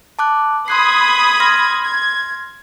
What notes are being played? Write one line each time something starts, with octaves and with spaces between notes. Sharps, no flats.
A5 D6 F#6
B5 C6 D#6 F#6 G#6 C7
C6 F6 A#6
G#6